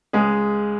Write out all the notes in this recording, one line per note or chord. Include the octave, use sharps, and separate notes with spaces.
C#2 G#3 G#4